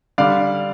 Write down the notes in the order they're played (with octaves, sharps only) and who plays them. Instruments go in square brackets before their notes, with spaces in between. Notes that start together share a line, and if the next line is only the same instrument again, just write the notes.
[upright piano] D3 G3 D5 F5